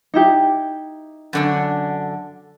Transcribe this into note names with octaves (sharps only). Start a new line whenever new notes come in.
D#4 E4 G4
F#2 D3 D4